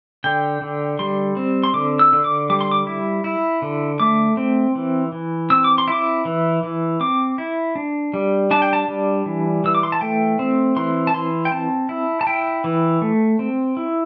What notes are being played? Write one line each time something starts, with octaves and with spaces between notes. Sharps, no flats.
D3 G5
D3
G3 C6
C4
C6
D3 D6
E6
D3
D6
G3 D6
C6
D6
E4
E4
D3
A3 D6
C4
E3
E3
C4 E6
D6
C6
E4 D6
E3
E3
C4 D6
E4
D4
G3
D4 A5
G5
A5
G3
E3
E3 E6
D6
C6
A5
A3 G5
C4
E3 C6
A5
E3 C6
G5
C4 A5
E4
A5
E4 G5
E3
A3
C4
E4